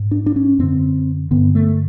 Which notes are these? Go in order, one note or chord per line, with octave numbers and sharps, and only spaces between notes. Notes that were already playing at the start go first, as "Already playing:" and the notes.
Already playing: G#2
D4
D4
C#4
F#2 D3 C4
G2 D3 B3
A3